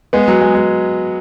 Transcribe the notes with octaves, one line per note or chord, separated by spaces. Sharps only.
G#3 B3
F#3
G#3
G#3